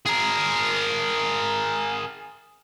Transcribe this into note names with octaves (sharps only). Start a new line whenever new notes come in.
G#4 A#4